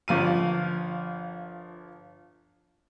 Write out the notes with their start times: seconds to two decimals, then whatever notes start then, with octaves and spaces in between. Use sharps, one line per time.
0.08 G1 F3 F5 D#7